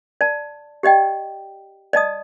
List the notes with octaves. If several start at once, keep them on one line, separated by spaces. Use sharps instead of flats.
D5 A5
G4 D5 D#5 G5
D5 D#5 A5 D#6